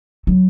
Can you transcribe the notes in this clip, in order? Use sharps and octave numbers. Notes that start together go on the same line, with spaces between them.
F#3